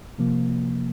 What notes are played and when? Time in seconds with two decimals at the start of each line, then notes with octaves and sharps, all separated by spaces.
0.18 C3 F3 A#3